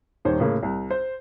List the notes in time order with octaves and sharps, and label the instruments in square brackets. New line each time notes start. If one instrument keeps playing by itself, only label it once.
[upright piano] D#1 D#3 C5 C#5
A2 C#3 A#3
C2
C5